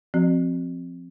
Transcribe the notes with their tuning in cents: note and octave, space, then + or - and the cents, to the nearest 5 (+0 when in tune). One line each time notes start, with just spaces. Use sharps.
F3 +0 C4 +0 F#4 +5